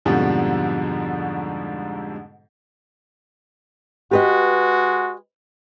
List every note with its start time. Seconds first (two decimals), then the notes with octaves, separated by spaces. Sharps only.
0.05 F2 G#2 B2 D3 F3 G3
4.11 G#3 F#4 G4 B4 D#5